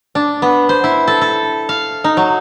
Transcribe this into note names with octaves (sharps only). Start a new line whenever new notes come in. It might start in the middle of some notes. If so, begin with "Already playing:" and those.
D4
B3
C5
E4
A4
A4
F5
D#4
F#3